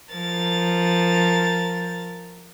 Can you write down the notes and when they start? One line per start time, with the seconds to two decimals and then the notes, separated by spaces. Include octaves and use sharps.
0.12 F3 A#4 A6